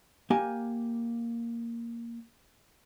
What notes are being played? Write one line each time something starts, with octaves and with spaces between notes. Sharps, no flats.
A#3 G4 G#5